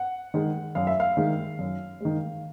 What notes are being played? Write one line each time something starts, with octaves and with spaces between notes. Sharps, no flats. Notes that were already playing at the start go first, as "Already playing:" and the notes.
Already playing: F#5
D#3 G#3
F#2 F5
E5
F5
D#3 G#3
F#2
D#3 G#3